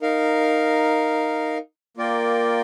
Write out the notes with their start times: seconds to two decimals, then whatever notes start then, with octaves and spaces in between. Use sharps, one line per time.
0.01 D#4 A#4 F5
1.97 A#3 F4 A#4 D5 G5